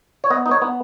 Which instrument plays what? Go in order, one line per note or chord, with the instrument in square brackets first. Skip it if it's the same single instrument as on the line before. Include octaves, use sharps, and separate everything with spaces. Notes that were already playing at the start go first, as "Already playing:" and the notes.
[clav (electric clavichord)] C#5
B3 D#5
D#4
C#5
B3